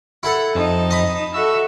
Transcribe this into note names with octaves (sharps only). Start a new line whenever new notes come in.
E4 A4 F#5
F2 D#4 A5
D#5 B5
F#4 A4 E5 E6